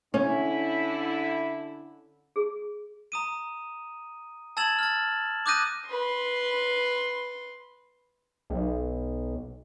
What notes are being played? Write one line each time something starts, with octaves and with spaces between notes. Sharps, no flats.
D3 C#4 E4
G#4
A#5 D#6 D#7
A5 E6 G#6 A6 E7 F#7
F6 A6
D6 D#6 F#6 G6 A#6 D#7
B4 C6
B1